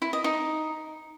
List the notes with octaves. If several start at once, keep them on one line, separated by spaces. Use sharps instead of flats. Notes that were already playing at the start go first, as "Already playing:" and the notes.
E4
D#5
D#4